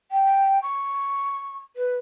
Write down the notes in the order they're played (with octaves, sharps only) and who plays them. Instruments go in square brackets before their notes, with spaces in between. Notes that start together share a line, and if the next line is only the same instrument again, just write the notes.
[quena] G5
C#6
B4